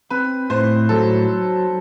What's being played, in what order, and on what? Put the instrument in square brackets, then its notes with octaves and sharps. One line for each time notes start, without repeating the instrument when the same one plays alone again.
[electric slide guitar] C4 [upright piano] B4
[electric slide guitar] A2 [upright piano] C5
[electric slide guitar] F#3 [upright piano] A4